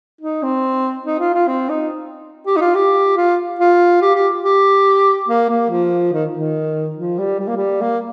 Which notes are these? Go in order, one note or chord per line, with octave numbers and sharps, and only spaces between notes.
D#4
C4
D#4
F4
F4
C4
D#4
G4
D#4
F4
G4
F4
F4
G4
G4
G4
A#3
A#3
F3
D#3
D#3
F3
G3
G3
A#3
G3
A#3